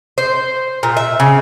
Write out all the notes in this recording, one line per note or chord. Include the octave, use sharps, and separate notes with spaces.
C5
A#2
E5
C#3